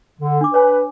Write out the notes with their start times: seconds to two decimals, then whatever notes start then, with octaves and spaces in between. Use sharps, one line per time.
0.20 D3
0.41 D4 D6
0.54 B4 C#5 G#5